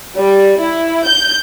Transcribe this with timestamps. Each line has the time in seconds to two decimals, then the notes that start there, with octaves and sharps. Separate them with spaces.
0.18 G3
0.60 E4
1.05 G6